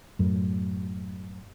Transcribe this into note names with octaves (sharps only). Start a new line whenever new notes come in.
F#2 A2